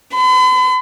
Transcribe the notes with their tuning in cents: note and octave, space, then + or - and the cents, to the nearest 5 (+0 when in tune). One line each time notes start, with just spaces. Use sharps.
B5 +45